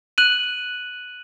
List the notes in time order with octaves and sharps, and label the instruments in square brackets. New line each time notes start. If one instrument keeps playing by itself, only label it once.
[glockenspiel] F#6 D#7 F#7